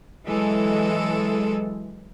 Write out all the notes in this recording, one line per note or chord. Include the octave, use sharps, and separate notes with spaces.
E3 F#3 G#3 A4